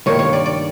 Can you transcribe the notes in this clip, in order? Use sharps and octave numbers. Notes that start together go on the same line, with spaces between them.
G2 D#3 G3 A#3 C#5
C#5
D5
D5